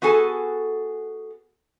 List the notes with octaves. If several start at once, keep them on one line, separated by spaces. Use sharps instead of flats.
B3 F#4 G#4 A4 G#5